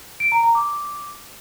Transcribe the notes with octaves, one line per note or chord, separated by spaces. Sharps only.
D7
A#5
A#5
D6